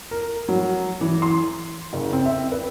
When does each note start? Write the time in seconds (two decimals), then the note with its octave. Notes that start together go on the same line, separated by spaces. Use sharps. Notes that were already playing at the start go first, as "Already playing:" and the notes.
0.11 A#4
0.48 F#3
1.01 E3
1.22 C6
1.93 F#1
2.13 C4
2.26 E5
2.52 B4